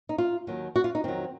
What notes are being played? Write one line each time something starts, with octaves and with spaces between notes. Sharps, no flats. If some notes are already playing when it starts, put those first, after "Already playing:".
D#4
F4
D#2 D#3 F#3
F#4
F4
D#4
F2 D#3 F#3 C4